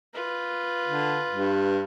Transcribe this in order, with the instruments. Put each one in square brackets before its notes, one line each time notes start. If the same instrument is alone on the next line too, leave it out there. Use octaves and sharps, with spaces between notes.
[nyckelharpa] F4 B4
[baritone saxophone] D3
G2